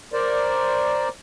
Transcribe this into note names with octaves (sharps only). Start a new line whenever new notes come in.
A#4 C5 D5